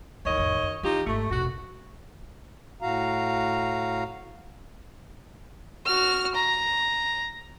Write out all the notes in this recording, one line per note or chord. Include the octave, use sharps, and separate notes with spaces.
D#2 D#3 E3 C#5 D#5
A1 F2
F#2
E3 D#4 F4 G4
G#1 A3
E1 A#1 F#4
A2 F#4 F5 A#5
F#4 F6
A#5